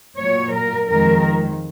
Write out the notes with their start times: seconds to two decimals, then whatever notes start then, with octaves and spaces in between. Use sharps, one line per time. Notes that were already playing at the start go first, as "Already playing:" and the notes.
0.19 A#2 F#3 C#5
0.54 A#4
0.89 F2 D#3 G#3 A#4